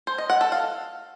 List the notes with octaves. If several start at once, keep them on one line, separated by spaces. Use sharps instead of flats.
C5
D#5
F#5
A4
F5